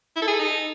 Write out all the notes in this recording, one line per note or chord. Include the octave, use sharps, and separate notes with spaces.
E4
A4
G#4
A4
D#4